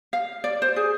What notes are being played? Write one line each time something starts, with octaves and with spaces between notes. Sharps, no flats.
F5
D5
C5
G#4